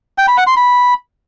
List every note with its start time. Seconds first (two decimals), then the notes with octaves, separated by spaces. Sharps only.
0.18 G5
0.28 B5
0.37 F#5
0.47 C6
0.57 B5